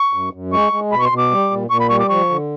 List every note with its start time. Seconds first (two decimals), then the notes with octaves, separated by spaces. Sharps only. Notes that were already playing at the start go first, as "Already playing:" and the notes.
Already playing: C#6
0.13 F#2
0.33 F#2
0.53 G#3 C#6
0.73 G#3
0.92 B2 B5
0.99 C#6
1.05 C6
1.12 B2
1.18 D6
1.31 G3
1.51 A#2
1.70 A#2 C#6
1.80 B5
1.90 G3 C#6
2.00 D6
2.10 F3 C#6
2.30 D3